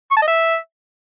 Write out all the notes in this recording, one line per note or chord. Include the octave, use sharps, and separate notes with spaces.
C#6
A5
D#5
E5